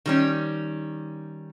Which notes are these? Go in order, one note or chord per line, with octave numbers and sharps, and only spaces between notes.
D#3 G3 C#4